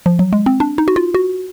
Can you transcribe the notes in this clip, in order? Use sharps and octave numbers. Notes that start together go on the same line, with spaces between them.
F3
F#3
G#3
C4
D4
D#4
F#4
F4
F#4